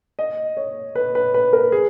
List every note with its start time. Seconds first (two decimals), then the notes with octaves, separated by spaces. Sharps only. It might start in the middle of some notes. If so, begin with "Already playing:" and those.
0.19 D#5
0.57 C#5
0.95 B4
1.15 B4
1.34 B4
1.53 A#4
1.72 G#4